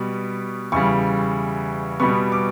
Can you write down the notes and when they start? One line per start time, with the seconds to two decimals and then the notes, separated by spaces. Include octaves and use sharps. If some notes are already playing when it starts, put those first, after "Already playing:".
Already playing: B2 G3 B3 C#6
0.72 E2 C#3 G3 C#6
2.00 B2 G3 B3 C#6
2.32 D6